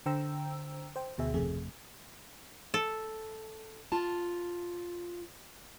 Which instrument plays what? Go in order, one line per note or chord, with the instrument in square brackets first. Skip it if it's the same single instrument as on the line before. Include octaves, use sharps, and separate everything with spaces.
[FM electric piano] D3 C5 G5 A#5 E6
C5 G5
D2 B2 G#4 E5
G#1 F2 C3 A3 G#4
[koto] A4
[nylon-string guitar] F4 A5